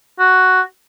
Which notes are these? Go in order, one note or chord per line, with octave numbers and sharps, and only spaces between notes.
F#4